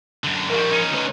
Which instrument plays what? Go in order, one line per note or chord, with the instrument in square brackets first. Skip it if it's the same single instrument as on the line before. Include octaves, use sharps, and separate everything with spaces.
[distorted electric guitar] F#2 D3
[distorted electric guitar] G#2 G3 [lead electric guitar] F3 A#4
[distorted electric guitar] C#4 D#4
[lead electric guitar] D2 B4